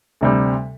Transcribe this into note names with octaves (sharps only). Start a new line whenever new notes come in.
D2 C3 G3